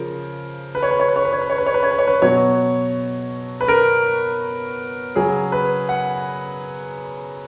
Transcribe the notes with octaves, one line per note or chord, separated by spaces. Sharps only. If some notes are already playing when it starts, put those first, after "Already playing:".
Already playing: C#3 F3 A#4
B4
C#5
B4
C#5
B4
C#5
B4
C#5
B4
C#5
B4
C#5
B4
C#5
B4
C#5
B4
B2 F#3 C#5
B4
A#4
C#3 F#3 G#4
B4
F#5